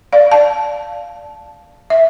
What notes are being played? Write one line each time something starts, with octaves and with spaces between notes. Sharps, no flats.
D5 F5
F5 A5
E5